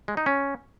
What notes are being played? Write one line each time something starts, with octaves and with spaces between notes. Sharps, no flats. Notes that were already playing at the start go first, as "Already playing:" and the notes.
G#3
D#4
C#4